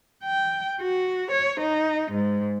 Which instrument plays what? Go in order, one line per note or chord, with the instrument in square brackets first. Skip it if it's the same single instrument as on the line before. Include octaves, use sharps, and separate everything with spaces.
[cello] G5
F#4
C#5
D#4
G#2